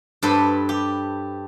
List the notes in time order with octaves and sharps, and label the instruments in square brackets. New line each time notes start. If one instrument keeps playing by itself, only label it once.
[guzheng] G2 A4 B4 C5
G4